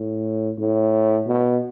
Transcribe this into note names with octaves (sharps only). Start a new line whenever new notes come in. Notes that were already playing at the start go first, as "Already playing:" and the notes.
Already playing: A2
A2
B2